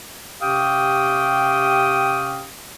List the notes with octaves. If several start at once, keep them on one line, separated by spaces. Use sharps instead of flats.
C3 C#4 G4 F5 G5 D#6